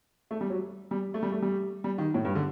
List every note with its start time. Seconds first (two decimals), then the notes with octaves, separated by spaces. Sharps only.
0.31 A3
0.41 G3
0.50 F#3
0.91 G3
1.14 A3
1.23 G3
1.32 A3
1.42 G3
1.84 G3
1.98 D#3
2.14 A2
2.25 G2
2.35 D3